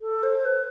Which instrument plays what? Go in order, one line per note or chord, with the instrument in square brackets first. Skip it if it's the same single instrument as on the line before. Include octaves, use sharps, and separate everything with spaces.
[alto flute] A4
C5
B4